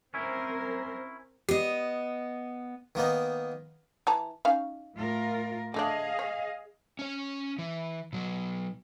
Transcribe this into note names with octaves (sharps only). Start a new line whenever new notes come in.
C4 C#4 E4 A#4 C5
B3 G4 D#5
D#3 A#3 B3 D#4
E3 A5 A#5
C#4 D#4 F5
A2 F4 A#4
D3 A3 D4 G#4 D#5 F5
C#5
C#4 C#5
E3
B2 F#3